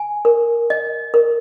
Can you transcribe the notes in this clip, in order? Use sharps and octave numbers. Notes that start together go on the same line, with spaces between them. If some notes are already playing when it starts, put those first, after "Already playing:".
Already playing: G#5
A#4
D#5
A#4